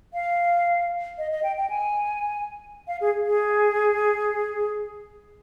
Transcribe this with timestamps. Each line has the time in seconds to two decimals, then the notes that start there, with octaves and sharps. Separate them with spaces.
0.14 F5
1.18 D#5
1.31 D#5
1.43 G5
1.57 G5
1.70 G#5
2.88 F5
3.01 G#4
3.26 G#4